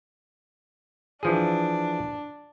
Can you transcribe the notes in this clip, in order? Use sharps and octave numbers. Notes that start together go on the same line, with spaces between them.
E3 F3 D4 G#4